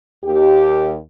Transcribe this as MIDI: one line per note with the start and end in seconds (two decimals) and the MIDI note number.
0.24 0.97 39
0.24 0.97 67